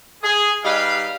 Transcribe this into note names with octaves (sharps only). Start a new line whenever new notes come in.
G#4
G3 D#4 B4 D#5 F5